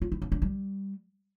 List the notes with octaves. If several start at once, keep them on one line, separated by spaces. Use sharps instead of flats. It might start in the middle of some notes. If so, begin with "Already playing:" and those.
F4
E4
D4
D4
G3